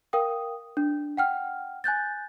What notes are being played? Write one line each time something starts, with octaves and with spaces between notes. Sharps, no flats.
A#4 F5 G5 D#6
D4
F#5 G5 F6
G#5 F#6 G6 A6